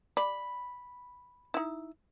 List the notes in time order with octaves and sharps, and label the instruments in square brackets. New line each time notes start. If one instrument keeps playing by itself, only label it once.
[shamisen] D5 [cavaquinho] B5
[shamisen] D#4 E4